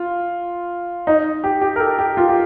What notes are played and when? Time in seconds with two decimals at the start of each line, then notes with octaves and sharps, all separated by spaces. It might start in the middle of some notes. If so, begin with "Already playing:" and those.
Already playing: F4
1.07 D#4
1.44 G4
1.61 G4
1.76 A#4
1.80 A4
1.99 G4
2.17 F4
2.29 G4